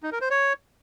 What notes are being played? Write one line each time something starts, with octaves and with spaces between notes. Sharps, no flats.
D#4
A#4
C5
C#5